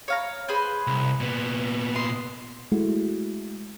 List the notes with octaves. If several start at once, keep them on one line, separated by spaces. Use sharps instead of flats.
C#5 F5 A#5
G#4 B4 C5
C2
A#2 B3
D#5 C6
G#3 A3 E4 F#4